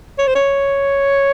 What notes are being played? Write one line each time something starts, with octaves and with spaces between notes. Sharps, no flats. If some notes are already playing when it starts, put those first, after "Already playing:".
C#5
C5
C#5